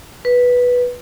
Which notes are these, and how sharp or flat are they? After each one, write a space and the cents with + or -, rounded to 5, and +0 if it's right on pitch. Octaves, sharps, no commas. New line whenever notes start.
B4 -5